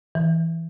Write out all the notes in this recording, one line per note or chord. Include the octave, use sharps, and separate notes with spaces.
E3